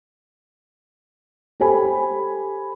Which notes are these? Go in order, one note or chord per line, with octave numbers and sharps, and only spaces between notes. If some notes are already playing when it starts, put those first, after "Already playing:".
G4 A4 C5 G#5 B5